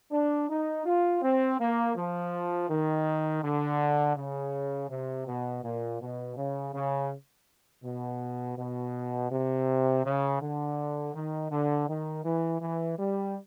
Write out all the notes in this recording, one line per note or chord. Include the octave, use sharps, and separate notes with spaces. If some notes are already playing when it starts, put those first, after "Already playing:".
D4
D#4
F4
C4
A#3
F3
D#3
D3
C#3
C3
B2
A#2
B2
C#3
C#3
B2
B2
C3
C#3
D3
D#3
D3
D#3
E3
E3
G3